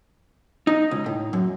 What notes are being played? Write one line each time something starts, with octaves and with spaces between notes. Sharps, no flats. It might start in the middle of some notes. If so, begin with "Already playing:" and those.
D#4
C#2
A2
F#2